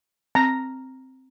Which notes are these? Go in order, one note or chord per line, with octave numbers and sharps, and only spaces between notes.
C4 A#5